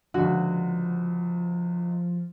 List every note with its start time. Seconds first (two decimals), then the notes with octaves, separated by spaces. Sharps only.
0.14 C#2 D3 F3 F#4